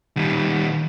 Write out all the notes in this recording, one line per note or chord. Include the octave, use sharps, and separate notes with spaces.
D#3 G3